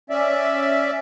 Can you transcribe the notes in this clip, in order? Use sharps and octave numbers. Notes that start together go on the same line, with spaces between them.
C#4 D5 E5